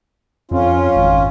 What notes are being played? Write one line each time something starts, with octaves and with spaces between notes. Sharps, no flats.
F2 C#4 F4
G#1